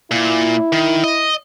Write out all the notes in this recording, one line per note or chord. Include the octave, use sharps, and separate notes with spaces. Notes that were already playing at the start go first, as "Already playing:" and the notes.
A#2 E4
D#3
D#5